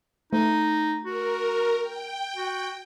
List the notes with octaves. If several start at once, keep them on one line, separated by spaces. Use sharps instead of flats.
A3 D#4
F#4 A#4
G5
F#4